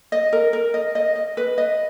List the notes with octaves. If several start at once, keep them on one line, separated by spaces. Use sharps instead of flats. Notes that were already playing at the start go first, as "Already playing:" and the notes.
D#5
A#4
A#4
D#5
D#5
D#5
B4
D#5